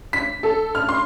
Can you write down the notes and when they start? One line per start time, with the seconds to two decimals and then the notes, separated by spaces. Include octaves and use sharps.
0.13 B6
0.43 A4
0.75 F6
0.89 C6